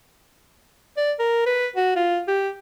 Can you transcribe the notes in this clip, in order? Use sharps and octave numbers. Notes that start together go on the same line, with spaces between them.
D5
A#4
B4
F#4
F4
G4